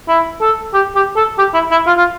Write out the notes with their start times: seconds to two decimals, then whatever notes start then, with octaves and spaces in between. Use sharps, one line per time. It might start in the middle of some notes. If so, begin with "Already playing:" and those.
0.08 E4
0.41 A4
0.74 G4
0.95 G4
1.17 A4
1.38 G4
1.54 E4
1.71 E4
1.86 F4
1.97 F4